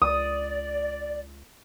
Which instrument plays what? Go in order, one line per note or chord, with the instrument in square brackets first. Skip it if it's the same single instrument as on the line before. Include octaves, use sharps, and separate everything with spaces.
[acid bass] C#2 [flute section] D5 [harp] D#6